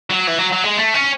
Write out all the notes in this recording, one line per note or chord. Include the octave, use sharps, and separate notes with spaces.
F#3
E3
F#3
F#3
G#3
A3
C#4